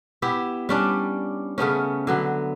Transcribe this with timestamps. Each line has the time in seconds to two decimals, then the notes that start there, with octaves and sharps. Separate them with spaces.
0.22 B3 E4 G4
0.69 G3 C#4 D4
1.58 C#3 A3 B3 C#4
2.07 D3 F#3 B3